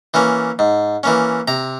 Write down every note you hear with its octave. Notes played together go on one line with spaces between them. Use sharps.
E3 A#3 C#4
G#2
E3 A#3 C#4
C3 A#5